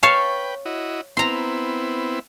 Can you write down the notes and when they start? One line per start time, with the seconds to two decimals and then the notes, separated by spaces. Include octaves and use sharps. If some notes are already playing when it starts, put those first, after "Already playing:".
0.03 B4 C#5 F5 G5 A5
0.65 E4 F#4 D#5
1.17 B3 C4 E4 A#5 C6